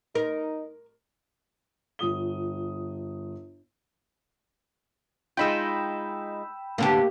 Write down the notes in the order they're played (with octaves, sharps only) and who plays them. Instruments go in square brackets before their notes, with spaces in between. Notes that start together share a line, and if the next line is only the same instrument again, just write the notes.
[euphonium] D#4 [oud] A#4
[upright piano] G1 F4 D#6 G7
[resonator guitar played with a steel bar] G#3 D#4 F4 [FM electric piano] G5 B5 E6
[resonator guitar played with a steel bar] A2 D3 B3 [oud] A#3 G4